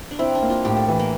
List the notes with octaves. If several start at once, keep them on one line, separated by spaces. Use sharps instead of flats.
D4
C4 E4
D4
A#3
F4
A2 G4
A4
E3
A#3